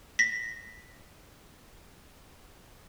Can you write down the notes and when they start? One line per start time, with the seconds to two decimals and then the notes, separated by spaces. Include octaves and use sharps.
0.19 A#6 B6